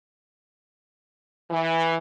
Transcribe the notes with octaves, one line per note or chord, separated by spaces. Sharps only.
E3